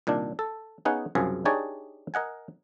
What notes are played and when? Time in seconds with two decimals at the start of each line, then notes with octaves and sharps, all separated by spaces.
0.07 C2 A#2 D#3 D4
0.39 A4
0.85 B3 C#4 D#4 G#4 F5 F#5
1.15 C2 F#2 C#3 F3 G#4
1.45 D4 D#4 G4 G#4 C#5 D5
2.14 A#4 D#5 F#5 G#5